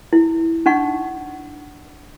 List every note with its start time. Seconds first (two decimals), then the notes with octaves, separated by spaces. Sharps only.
0.13 E4
0.66 D4 D#4 F#5 C#6